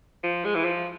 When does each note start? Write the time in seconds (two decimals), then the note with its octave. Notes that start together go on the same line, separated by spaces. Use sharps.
0.23 F3
0.45 G#3
0.55 E3
0.65 F3